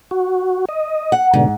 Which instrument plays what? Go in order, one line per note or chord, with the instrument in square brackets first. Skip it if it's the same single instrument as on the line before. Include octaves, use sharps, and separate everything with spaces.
[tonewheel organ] F#4
D#5
[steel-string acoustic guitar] F#5
[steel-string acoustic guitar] G#2 [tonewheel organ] B2 D3